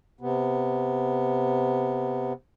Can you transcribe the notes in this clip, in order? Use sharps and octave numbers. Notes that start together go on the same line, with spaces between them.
C3 B3